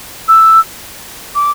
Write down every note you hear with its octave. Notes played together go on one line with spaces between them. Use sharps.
E6
D6